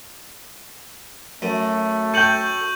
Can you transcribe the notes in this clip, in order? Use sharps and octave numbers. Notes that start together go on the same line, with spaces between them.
F#2 A3
A4 G5 C#6 G6 F#7